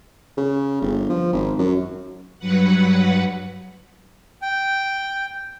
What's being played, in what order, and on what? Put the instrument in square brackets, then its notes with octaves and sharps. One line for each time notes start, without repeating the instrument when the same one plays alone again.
[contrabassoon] C#3
G1
F3
G#1
F#2
[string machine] G2 F#3 B4 F#5
[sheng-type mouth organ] G5